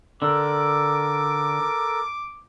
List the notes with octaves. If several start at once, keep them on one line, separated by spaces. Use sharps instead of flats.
D3 A4 A#4 D6